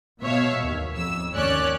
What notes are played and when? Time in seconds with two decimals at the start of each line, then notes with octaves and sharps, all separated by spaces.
0.22 B2 C#5 E5 F5
0.64 D#2
0.96 F2 E6
1.34 D#2 C#4 C#5 D5 F#6